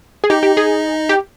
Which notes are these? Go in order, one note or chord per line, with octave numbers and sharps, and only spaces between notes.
G#4
D#4 G4 D#5
G4
G#4
G4